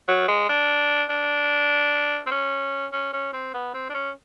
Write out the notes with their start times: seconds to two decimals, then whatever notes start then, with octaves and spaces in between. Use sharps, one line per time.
0.08 F#3
0.28 G#3
0.49 D4
1.09 D4
2.26 C4
2.31 C#4
2.92 C#4
3.13 C#4
3.33 C4
3.54 B3
3.74 C4
3.89 D4
3.94 C#4